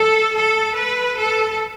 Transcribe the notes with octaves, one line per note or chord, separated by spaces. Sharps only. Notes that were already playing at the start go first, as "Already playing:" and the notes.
Already playing: A4
A4
B4
A4